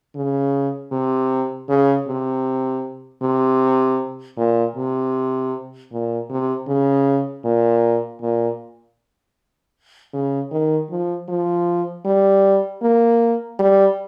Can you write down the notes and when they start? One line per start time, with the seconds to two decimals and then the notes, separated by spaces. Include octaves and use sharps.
0.15 C#3
0.92 C3
1.69 C#3
2.08 C3
3.22 C3
4.37 A#2
4.76 C3
5.92 A#2
6.30 C3
6.67 C#3
7.45 A#2
8.22 A#2
10.13 C#3
10.51 D#3
10.90 F3
11.29 F3
12.05 G3
12.82 A#3
13.59 G3